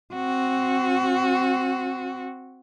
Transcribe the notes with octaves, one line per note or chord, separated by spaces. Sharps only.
C4 F#4